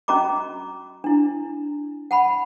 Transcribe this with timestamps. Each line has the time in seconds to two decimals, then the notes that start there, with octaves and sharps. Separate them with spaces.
0.08 C#4 F#4 D#5 A#5 D6
1.04 D4 E4
2.11 F#5 A5 B5